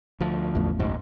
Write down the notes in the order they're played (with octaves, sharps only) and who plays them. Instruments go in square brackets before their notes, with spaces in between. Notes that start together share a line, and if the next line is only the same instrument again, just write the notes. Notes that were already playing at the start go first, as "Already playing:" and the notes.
[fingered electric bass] D2 F3
[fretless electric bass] A1 E2 A3
[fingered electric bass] F#1 B1 G#2